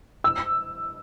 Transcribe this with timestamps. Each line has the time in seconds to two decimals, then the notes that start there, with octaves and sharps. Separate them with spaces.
0.24 E6